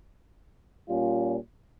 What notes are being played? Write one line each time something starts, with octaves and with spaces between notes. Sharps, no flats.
A#2 G3 C#4 F4